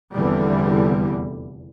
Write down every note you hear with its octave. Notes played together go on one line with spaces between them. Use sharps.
F1 E2 D3 E3 G3